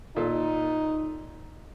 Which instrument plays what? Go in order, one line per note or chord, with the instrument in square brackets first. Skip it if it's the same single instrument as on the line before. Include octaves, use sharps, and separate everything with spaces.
[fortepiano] A#2 A4 [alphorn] D#4